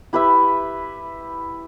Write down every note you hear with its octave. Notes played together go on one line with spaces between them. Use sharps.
E4 G4 B4 E5